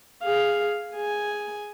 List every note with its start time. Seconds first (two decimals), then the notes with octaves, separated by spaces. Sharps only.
0.23 G#4 F5
0.92 G#4 G#5